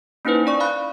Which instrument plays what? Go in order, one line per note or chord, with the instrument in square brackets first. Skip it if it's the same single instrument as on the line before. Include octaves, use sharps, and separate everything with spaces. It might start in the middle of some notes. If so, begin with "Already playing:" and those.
[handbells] A#3 C#4 D#4 E4 B4 C5
C#4 D5 C#6
F5 B5 F#6